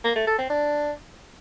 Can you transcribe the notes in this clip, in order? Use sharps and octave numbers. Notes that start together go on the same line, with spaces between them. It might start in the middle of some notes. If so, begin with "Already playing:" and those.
A#3
A3
A4
C4
D4